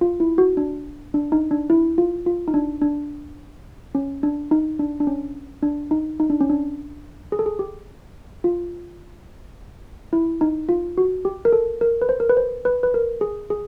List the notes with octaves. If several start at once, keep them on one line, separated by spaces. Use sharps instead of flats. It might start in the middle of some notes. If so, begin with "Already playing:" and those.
F4
E4
F#4
D4
D4
D#4
D4
E4
F4
F4
D#4
D4
D4
C#4
D4
D#4
D4
D4
C#4
D4
D#4
D#4
D4
C#4
D4
G#4
A4
G#4
G4
F4
E4
D#4
F4
F#4
G4
A#4
A4
A#4
B4
C5
A#4
B4
C5
B4
B4
A#4
G#4
G#4